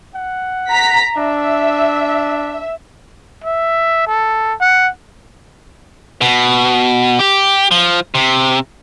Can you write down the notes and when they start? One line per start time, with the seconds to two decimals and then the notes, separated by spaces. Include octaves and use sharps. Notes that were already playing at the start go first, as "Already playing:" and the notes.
0.15 F#5
0.71 A#5 B6
1.17 D4 E5
3.44 E5
4.07 A4
4.61 F#5
6.21 B2
7.19 G4
7.71 F3
8.15 C3